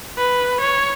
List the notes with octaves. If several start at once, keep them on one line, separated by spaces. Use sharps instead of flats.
B4
C#5